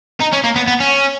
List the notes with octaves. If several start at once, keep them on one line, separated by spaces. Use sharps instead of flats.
D#4
C#4
A#3
B3
B3
C#4